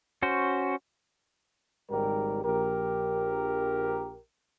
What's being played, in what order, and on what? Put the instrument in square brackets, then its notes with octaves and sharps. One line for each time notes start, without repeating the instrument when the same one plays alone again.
[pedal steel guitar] C#4 F#4 C5
[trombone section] G#1 G#2 C#3 G3 G4 A#4
A#1 G4 A#4